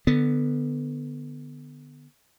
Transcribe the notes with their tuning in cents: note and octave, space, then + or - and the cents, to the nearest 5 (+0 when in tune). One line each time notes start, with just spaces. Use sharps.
D3 +15 B3 +0